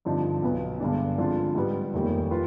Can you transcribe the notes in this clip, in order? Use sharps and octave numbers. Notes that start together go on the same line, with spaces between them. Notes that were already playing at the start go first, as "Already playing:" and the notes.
G2 D3 F3 C4 D#4
B1 B2 B3
G2 D3 G#3 D4
D3 F3 G#3 C4 F4
G#2 G3 B3
F1 D#2 D#3 G3
F4 B4